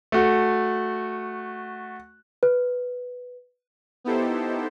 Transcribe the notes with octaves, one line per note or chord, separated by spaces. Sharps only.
A3 F#4
B4
B3 D#4 E4 G4 A4 C5